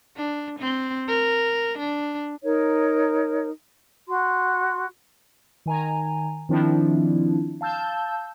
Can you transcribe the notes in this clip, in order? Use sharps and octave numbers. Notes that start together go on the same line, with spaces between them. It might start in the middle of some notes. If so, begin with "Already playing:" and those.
D4
C4
A#4
D4
D#4 A#4 C#5
F#4 C6
D#3 G#5 A#5
D#3 F3 C4 D4 E4
F5 A5 E6 G6